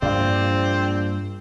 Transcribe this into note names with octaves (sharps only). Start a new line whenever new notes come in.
A#1 G2 A#3 C4 D5 F5